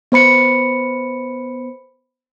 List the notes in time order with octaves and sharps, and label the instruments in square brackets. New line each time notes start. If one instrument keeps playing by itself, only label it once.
[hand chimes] B3 C5 B5 C#7